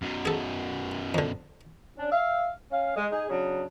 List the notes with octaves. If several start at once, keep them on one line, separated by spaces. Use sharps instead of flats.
F#2 B2
G#4 A4
F2 D3
C#4 D4
E5 F5
C#4 F5
G#3
D#4 G#4
C#3 F#3 D4